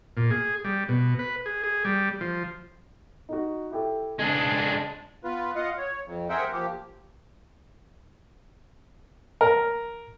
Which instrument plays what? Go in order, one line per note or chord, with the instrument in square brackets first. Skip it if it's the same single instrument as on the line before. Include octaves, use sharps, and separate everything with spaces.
[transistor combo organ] A#2
G#4
G3
B2
B4
G#4
G#4
G3
F3
[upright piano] D#4 F#4
E4 G4 A4
[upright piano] C#3 [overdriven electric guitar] G#3 D4
[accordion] B3 F4 B4
F4 D#5 F5 F#5
C#5
F2
G#4 A#4 C5 E5 F#5 G5
F3 A#3 G4
[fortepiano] A#4